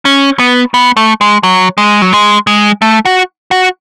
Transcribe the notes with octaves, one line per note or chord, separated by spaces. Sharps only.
C#4
B3
B3
A3
G#3
F#3
G#3
F#3
G#3
G#3
A3
F#4
F#4